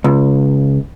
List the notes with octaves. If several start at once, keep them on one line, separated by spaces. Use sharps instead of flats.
C#2